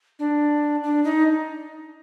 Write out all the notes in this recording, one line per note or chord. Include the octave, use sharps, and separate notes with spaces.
D4
D4
D#4